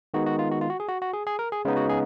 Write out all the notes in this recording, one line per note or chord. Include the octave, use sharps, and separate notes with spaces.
D#3 G#3 B3 D#4 F#4
F#4
F4
F#4
F4
F#4
G#4
F#4
F#4
G#4
G#4
A#4
G#4
C#3 G#3 B3 D#4
F#4
G#4